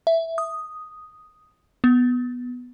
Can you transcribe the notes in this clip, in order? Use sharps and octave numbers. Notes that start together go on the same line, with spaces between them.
E5
D#6
B3